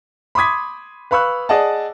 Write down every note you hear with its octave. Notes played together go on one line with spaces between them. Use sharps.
B5 C6 D6 D#6 G#6 B6
B4 F5 B5 C#6 E6 F#6
G#4 D5 D#5 F#5 A5